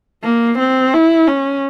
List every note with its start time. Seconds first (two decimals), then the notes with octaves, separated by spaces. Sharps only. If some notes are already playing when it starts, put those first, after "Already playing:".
0.24 A#3
0.59 C4
0.94 E4
1.27 C#4